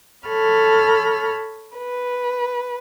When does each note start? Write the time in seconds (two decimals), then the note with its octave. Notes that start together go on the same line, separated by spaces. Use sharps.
0.27 A4 C#5 B5 F6
1.76 B4